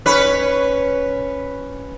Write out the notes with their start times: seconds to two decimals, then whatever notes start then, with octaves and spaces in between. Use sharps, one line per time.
0.06 C#4 B4